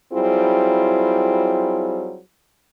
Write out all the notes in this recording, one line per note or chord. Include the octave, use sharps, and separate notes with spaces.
F#3 G3 C4 E4 F4 G#4